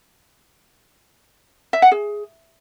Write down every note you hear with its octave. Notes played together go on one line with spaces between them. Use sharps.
E5
F#5
G#4